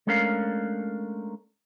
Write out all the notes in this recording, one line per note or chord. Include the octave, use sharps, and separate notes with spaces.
G#3 A3 C#4 D4 A#4 F5